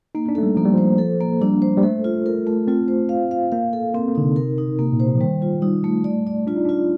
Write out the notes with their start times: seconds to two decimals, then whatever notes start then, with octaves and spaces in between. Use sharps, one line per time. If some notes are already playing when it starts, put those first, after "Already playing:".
0.15 A#3 D#4
0.29 D4
0.35 A3 A4
0.43 G3
0.57 F3 A#3
0.65 G3
0.73 F3 C5
0.98 A4
1.21 A#3
1.41 G3 D4
1.62 C5
1.77 G3
1.83 A3 A4
2.04 F4
2.26 A#4
2.47 A3
2.68 C4 F4
2.88 C5
3.09 F5
3.31 F5
3.52 A#3 F5
3.73 A4
3.94 A#3 C4
4.08 A#3
4.15 D3 D#4
4.22 C3
4.36 A#4
4.58 D#4
4.78 C3 A#3
4.92 A#2
5.00 C5
5.06 C3
5.15 F3
5.21 D#3 G3
5.42 F4
5.62 G3 D#4
5.84 A3
6.04 D5
6.27 D5
6.47 D4 F4
6.56 D#4
6.65 D4 F4